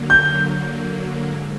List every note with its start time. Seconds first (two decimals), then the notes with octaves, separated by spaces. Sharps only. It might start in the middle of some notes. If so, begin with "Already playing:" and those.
Already playing: D3 F#3 A#3
0.10 G6
1.28 G#2